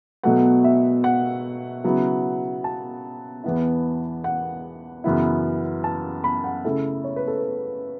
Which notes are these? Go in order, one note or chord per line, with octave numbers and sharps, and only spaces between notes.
B2 F#3 A3 F#5
E5
F#5
C#3 F#3 B3 E4
A5
E2 E3 B3 E4
F#5
F#2 C#3 E3 B3 E4
A5
B5
F#5
C#3 A3 E4 A4
C#5
B4
A4
B4